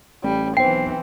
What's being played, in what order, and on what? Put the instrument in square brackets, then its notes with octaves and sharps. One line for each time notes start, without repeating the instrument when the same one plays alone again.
[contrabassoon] A1 [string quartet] G3
[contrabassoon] B1 [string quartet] E3 C4 [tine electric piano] C5 C7 [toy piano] G5